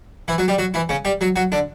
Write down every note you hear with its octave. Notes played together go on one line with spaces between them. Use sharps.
E3 E4
F#3 F#4
G3 G4
F#3 F#4
E3 E4
C#3 C#4
G3 G4
F#3 F#4
F#3 F#4
D3 D4